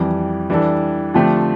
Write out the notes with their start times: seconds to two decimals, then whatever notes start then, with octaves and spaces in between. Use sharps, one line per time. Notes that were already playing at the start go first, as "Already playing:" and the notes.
Already playing: F2 E3 G3
0.50 E3 G3 D4 A4
1.14 D3 F3 A3 C4 G4